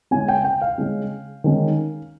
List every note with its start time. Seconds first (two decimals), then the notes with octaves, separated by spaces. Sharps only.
0.11 C#3 G#3 C#4 G#5
0.28 G5
0.44 G5
0.62 F5
0.78 C#3 G#3 C#4
1.44 D#3 G#3 C#4